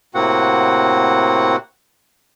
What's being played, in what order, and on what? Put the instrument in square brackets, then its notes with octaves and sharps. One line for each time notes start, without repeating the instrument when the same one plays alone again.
[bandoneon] A2 C3 A#3 C4 F#4 F#5